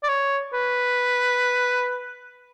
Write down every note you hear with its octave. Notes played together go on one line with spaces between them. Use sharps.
D5
C#5
B4